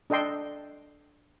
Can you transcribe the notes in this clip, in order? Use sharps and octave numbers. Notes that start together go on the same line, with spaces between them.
D4 A4 D#5 G5 C6